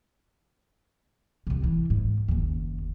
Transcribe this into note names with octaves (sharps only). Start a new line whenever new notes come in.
C2 C3
E3
G#2
F#1 D#2